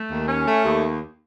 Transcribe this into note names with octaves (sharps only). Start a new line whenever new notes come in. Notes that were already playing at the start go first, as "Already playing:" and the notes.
Already playing: A3
D#2
C#4
A3
D#2